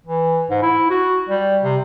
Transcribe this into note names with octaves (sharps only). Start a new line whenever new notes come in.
E3
G#2
E4
F#4
G3
C3